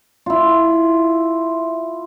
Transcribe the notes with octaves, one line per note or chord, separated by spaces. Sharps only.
E4 F4